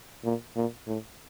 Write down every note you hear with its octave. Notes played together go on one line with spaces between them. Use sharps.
A#2
A#2
A2